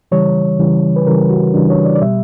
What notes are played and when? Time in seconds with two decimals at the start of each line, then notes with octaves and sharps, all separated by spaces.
0.12 C#3 E3 G3 C#5
0.59 C#3 E3 G3
0.96 B4
1.07 C#3 E3 G3 A#4
1.30 F#4
1.54 C#3 E3 G3 D4
1.70 C#5
1.85 D5
1.95 D5
2.02 B2 G3 E5